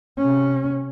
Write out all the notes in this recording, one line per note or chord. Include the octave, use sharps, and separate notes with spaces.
C3 C#4